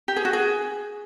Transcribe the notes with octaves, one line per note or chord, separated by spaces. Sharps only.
G4
G#4
F#4
G#4